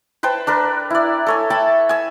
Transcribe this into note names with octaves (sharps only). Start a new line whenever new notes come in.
B4 C5 G5 A5
D4 A#4 B4
E4 D5
A4 C#5 G#5
E5 G5 A5 B5
G#5 E6